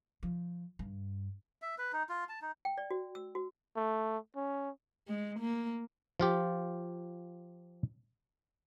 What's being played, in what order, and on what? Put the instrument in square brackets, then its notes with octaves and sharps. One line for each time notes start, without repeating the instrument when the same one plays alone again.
[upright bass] F3
G2
[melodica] E5
B4
D#4
F4
A5
D#4
[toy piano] G5
D5
F#4
E6
F#4
[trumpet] A3
C#4
[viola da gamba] G#3
A#3
[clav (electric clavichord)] F3 F4 G4